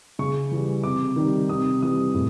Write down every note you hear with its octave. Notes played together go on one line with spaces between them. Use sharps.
C#3 C#6
E3 G3
C3 D6
D#3 G3
C3 D#6
E3 G3 D#6
A2